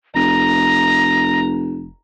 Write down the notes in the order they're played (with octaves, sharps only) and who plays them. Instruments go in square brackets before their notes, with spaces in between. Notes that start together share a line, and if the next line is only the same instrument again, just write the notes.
[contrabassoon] F1 [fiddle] A#5 [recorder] A#6